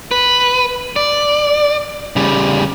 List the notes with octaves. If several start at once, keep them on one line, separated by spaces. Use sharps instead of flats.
B4
D5
C#3 G3